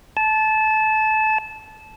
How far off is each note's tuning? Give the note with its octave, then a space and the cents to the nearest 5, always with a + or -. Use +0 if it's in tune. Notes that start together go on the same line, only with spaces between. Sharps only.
A5 -20